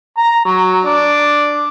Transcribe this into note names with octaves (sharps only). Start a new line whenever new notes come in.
A#5
F#3
D4